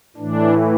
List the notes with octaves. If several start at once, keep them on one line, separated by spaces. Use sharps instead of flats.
A2 E3 D4